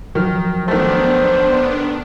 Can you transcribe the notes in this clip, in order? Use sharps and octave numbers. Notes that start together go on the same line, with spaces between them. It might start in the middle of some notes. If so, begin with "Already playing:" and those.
D#3 F3 F#3 F6
D#3 A3 B3 D4 C5